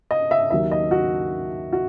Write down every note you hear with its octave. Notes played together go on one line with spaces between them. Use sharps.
D#5
E5
D#2 D#3 F#3 E5
D#5
F#4
F#4